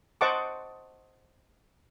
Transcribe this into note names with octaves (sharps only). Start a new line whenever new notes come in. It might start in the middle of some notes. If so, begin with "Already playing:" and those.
C5 D#5 F#5 A5 C#6 D6